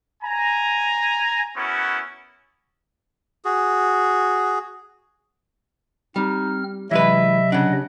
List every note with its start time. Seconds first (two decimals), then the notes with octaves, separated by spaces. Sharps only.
0.23 G#5 A#5
1.56 B3 C#4 E4 F#4 A#4
3.45 F#4 G#4
6.16 G3 C4 D#4 F6
6.91 C3 E3 F#3 G#3 B4 D#5 E5
7.52 C#3 D4 F#5